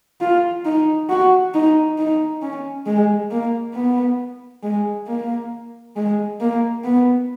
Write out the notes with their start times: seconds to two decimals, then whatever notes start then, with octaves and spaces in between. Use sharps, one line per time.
0.21 F4
0.65 D#4
1.09 F#4
1.54 D#4
1.98 D#4
2.42 C#4
2.86 G#3
3.31 A#3
3.74 B3
4.63 G#3
5.07 A#3
5.96 G#3
6.41 A#3
6.84 B3